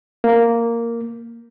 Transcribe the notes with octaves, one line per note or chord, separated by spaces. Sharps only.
A#3